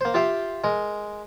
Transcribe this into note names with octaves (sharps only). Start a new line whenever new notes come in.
A#3 C5
F4 G4 E5 F5 G5
G#3 A#4